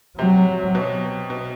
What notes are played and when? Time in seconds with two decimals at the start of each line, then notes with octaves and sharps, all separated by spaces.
0.19 C3 F#3
0.75 B2
1.30 B2